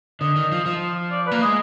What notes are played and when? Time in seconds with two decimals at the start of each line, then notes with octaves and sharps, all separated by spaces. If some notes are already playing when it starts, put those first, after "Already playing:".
0.21 D3 D#5
0.36 D#3
0.52 F3
0.66 F3
1.11 D5
1.26 B4
1.31 A#3
1.42 G#3 D#5